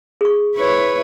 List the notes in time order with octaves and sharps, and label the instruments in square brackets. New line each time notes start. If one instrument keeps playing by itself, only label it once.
[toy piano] G#4 C#6
[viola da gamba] E4 B4 C#5